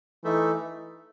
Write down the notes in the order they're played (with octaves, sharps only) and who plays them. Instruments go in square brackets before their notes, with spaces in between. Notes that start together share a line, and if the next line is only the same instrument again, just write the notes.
[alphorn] E3 [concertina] A3 D#4 A4 E5